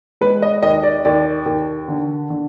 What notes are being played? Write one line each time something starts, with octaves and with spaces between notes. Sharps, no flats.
G#3 B4
D#5
D#2 D#5
D5
D#2 D5
D#2
D3
D3